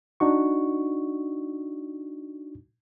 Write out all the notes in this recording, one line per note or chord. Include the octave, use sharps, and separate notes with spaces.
D4 D#4 F#4 C#6